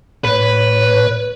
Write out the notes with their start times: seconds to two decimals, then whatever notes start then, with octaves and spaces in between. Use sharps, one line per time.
0.25 A2 B4 C#5